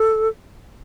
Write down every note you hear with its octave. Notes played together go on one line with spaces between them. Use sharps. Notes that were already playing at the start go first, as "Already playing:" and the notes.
Already playing: A4